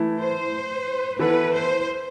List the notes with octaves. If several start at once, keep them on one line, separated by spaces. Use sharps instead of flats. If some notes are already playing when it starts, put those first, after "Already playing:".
Already playing: E3 A3 E4
C5
E3 B3 E4 A4 B4
C5